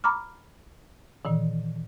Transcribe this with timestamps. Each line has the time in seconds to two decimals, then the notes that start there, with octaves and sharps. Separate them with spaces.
0.04 A#5 B5 D6 F6
1.25 A#2 D#3 E3